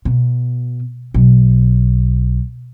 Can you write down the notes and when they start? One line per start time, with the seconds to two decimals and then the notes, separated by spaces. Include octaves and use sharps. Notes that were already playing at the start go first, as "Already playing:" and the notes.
0.05 B2
1.14 B1